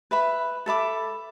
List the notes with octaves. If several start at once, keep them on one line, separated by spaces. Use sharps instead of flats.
B4 E5 B5
A4 E5 B5 D6